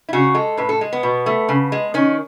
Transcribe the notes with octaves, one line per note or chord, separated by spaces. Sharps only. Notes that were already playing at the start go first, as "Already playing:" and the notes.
E4
C#3 F#4
G#3 A4
A2 B4
A4
G#3
B3
B2
A3
C#3
G#3
D#3 C#4